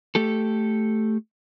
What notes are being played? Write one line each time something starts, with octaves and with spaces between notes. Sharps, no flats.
A3 G4 A4